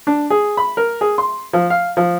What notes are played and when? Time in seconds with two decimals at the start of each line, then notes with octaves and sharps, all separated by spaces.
0.07 D4
0.30 G#4
0.57 B5
0.77 A#4
1.01 G#4
1.18 C6
1.53 F3
1.70 F5
1.97 F3